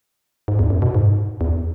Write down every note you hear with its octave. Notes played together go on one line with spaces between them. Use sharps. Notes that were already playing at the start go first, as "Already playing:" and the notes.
G#2
E2
F#2
B2
G#2
E2